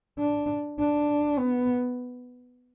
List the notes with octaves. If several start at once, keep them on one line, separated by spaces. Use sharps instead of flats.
D4
D4
B3